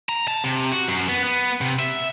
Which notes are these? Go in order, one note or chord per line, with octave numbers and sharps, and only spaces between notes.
A#5
A5
C3
F#4
F#2
B3
B3
C3
E5